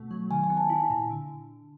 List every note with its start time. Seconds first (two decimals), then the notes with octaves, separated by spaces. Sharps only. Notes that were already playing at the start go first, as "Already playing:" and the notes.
Already playing: B2 A3
0.11 F#3
0.31 D#3 G#5
0.44 G#5
0.50 B3
0.57 A5
0.70 E4 G#5
0.90 A#2
1.10 D3